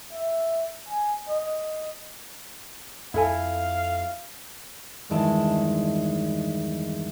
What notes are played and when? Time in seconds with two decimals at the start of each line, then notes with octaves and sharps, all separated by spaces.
0.13 E5
0.89 G#5
1.29 D#5
3.14 F2 E4 A4 F5 G#5
5.09 E2 G2 D#3 G#3 E4 A5